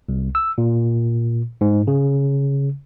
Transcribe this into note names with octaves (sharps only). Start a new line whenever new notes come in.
C2
E6
A#2
G#2
C#3